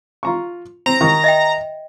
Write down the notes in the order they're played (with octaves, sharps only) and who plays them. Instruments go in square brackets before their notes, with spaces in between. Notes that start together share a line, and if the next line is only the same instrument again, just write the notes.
[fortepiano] F4 A#5 C#6
[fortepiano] C4 [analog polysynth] A#5
[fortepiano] D#3 C#6
[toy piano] D#5 E5 G5